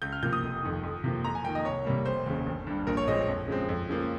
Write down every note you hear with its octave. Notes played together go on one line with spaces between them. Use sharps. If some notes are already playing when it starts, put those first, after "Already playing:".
C#2 G6
F6
C3 F3 A#3 G6
D#6
F1
F2 D#3
F2
C3 F3 A#3
F2 A#5
G#5
D#3 A#3 G5
D#5
C2 C#5
C3 G3 A#3
F1 C5
D#2 C#3
G1
G2 G3
A#1 A#4
C#5
A#2 G#3 C4 D#5
F2
C#3 G#3 C4
F2
C#3 F3 A#3